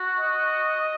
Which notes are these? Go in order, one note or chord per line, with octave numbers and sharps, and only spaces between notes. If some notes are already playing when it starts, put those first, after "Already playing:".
Already playing: F#4
D#5